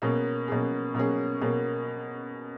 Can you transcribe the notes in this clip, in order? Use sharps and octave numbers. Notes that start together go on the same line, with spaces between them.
B2 A#3 C#4 G#4
B2 A#3 C#4 G#4
B2 A#3 C#4 G#4
B2 A#3 C#4 G#4